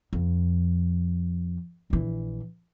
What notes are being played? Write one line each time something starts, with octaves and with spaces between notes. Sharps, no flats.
F2
A#1 E3